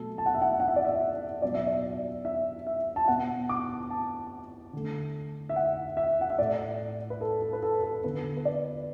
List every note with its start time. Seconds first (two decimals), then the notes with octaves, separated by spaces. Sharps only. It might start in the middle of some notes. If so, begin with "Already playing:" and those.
Already playing: B2 F#3 A3 A4
0.18 A5
0.26 F#5
0.34 E5
0.42 F#5
0.60 F#5
0.68 E5
0.76 D5
0.85 E5
1.42 B2 F#3 B3 D5
1.54 E5
1.67 D5
2.25 E5
2.67 E5
2.96 A5
3.08 B2 B3 F#5
3.49 D6
3.90 A5
4.73 D3 A3
5.49 E5
5.56 F#5
5.97 E5
6.21 F#5
6.30 E5
6.39 A2 A3 D5
7.10 B4
7.21 A4
7.42 A4
7.53 B4
7.63 A4
7.83 A4
8.04 D3 B3 B4
8.37 B4
8.45 D5